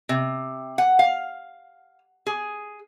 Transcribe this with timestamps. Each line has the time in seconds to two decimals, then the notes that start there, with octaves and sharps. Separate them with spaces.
0.09 C3
0.78 F#5
0.99 F5
2.27 G#4